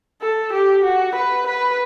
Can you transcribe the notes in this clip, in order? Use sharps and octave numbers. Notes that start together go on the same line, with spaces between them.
A4
G4
F#4
B4
B4